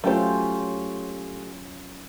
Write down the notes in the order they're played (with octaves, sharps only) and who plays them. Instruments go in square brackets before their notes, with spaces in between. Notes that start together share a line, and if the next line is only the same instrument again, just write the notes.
[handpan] F#3 C#4 F4 [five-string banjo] A3 G4 C5